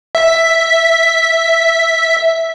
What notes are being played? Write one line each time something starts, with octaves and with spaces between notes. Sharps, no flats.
E5 B6